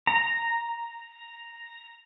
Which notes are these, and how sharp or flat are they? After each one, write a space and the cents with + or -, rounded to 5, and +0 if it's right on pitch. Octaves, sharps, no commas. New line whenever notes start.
A#5 -5